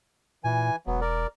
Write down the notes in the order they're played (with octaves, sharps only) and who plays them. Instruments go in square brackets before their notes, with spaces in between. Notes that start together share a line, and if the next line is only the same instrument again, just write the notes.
[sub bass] A#2 [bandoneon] E3 G#5
[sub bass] E1 [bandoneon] F#3 B3
[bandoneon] A#4 D5